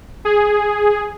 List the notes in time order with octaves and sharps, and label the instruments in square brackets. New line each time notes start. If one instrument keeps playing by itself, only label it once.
[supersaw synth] G#4